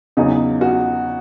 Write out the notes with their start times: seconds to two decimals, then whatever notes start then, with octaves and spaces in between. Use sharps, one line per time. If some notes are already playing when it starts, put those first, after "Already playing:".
0.17 E2 C#3 F#3 D#4
0.61 F#4